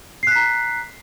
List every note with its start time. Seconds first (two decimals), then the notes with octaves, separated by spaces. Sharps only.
0.23 C7
0.27 F#6
0.31 B6
0.35 A#5